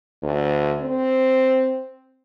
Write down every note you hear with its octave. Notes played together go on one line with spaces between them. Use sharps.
D2
C4